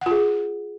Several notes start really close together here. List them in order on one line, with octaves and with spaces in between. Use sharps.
F#5 F4 G#4